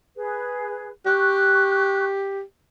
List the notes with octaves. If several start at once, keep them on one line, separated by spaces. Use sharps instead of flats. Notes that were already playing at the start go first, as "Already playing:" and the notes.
G#4 B4
G4 C#6 F#6